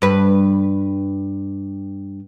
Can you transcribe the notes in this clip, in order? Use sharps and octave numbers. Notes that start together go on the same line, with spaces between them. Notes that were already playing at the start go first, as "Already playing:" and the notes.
G2 B4